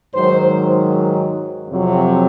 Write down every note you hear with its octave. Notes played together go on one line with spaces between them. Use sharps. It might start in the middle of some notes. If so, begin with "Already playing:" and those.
G#2 D#3 F#3 C5
F2 C3 F#3